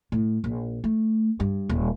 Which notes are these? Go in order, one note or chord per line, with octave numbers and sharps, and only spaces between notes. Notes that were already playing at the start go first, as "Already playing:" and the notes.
A2
A#1
A3
G2
D#1